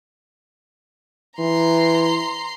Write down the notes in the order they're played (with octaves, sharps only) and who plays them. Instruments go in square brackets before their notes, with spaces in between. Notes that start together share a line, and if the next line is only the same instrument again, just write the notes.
[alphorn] E3 [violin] A#5 C6